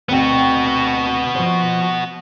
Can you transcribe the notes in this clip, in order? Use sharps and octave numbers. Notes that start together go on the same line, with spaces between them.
D2 B3 C4 F#4 G5
F3 C5